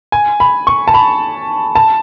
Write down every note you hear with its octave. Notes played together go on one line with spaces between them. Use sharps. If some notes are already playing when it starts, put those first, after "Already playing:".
G#5
B5
C#6
A5
B5
A5